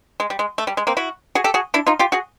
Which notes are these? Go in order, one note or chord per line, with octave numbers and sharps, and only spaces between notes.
G#3
G3
G#3
A3
G3
G#3
A#3 C4
E4 F#4
F#4 G#4
G4 A4
F#4 G#4
D4 E4
D#4 F4
F4 G4
F#4 G#4